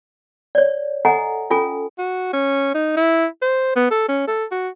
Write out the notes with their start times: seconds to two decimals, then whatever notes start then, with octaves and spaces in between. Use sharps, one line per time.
0.55 C#5 D5
1.05 A4 D#5 F#5 G#5 A#5
1.50 C#4 F4 A4 G#5
1.98 F#4
2.33 C#4
2.75 D#4
2.97 E4
3.42 C5
3.76 B3
3.91 A4
4.08 C#4
4.28 A4
4.52 F#4